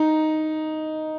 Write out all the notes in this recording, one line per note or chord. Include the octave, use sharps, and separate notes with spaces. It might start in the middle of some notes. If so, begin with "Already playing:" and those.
Already playing: D#4